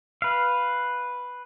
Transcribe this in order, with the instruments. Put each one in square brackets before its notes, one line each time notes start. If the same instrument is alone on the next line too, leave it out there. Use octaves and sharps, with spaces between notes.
[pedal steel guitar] B4 F5